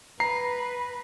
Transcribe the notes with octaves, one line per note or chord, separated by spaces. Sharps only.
B4 A#5 C7